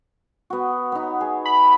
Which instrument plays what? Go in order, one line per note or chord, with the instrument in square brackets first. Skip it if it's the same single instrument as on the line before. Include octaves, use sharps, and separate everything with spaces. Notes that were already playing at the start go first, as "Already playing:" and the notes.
[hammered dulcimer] B3 F#4
B3 D#4
G#4
[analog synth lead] B5